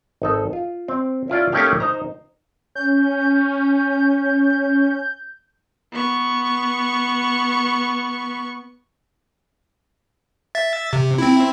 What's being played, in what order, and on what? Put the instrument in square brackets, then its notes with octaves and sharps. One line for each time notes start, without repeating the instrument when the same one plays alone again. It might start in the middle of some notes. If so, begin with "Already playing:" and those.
[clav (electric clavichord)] G#1 D#4 A4
F4
C4
C#4 E4 F4 D5
A3 A#3 C#4 D#4 G4 F5
D#4 C5 A#5
[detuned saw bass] C#4 [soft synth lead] G6
[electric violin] B3 C#6
[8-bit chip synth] E5 A6
C3
C4 E4